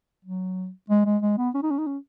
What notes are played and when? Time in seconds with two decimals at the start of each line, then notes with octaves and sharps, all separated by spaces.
0.25 F#3
0.90 G#3
1.06 G#3
1.22 G#3
1.38 B3
1.54 C#4
1.63 D#4
1.71 C#4
1.78 D#4
1.86 C#4